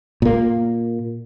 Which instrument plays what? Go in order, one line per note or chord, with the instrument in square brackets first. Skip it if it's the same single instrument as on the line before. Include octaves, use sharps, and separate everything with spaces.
[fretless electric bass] A#2 A#3